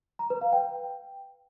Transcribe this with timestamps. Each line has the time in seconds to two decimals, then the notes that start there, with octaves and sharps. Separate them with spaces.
0.19 A#5
0.30 B4
0.41 F5
0.52 G5